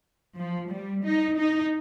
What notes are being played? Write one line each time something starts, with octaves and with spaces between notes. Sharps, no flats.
F3
G3
D#4
D#4